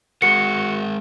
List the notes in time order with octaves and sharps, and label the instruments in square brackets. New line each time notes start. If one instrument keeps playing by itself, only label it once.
[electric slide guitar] G#3 G#4 A#4 [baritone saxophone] F#4 [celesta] C#7